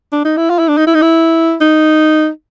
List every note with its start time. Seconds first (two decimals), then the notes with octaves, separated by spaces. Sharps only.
0.12 D4
0.25 D#4
0.37 E4
0.50 F4
0.59 E4
0.68 D4
0.77 D#4
0.87 E4
0.95 D#4
1.02 E4
1.61 D#4